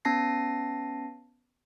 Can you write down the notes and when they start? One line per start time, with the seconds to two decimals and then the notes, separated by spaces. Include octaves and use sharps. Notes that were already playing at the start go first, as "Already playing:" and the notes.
0.05 B3 C#4 A5 A#6 C7